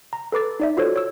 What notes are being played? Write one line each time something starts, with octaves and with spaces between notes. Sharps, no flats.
A#5
A4 B4 D6 A6
D#4 D5 E5
F4 F#4 A4 C5 C#5
C#5 E6